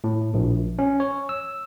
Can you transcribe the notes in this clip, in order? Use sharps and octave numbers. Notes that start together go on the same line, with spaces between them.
A2
A#1
C#4
C#5
E6